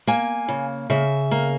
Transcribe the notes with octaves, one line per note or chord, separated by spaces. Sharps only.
A#3 G#5
C#3
C#3 E5
A#3